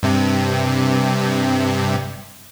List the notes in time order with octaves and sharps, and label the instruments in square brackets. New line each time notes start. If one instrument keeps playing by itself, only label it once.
[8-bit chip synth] G2 C3